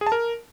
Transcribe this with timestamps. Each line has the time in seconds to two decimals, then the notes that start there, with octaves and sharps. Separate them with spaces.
0.01 G#4
0.06 A5
0.12 A#4